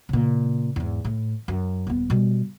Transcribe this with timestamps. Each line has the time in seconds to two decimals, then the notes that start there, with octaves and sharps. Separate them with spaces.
0.09 A#2 C#3
0.76 E2 G#2
1.05 A2
1.48 F#2
1.87 D#1 B3
2.10 B2 G3